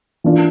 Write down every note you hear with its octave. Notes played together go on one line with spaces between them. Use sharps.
E3 A#3 D4 F4